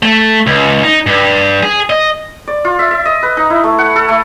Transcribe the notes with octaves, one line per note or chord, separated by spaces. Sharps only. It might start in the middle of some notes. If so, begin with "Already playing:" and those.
A3
C#2
D#4
G2
G#4
D#5
D5
F4
E5
E5
D#5
B4
D#4
E4
A3
F#5
A4
A3